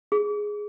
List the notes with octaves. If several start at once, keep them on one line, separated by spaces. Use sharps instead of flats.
G#4